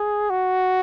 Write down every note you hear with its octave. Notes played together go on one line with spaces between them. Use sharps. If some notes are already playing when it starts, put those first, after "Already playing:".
Already playing: G#4
F#4